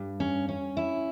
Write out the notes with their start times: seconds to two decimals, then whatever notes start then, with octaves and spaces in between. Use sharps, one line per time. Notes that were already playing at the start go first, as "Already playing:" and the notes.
Already playing: G2
0.20 C#4
0.49 C#4
0.77 E4